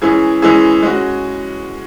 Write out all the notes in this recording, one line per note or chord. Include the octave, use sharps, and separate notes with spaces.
E3 G#3 C#4 E4 G#4
E3 G#3 C#4 E4 G#4
G#3 C#4 F#4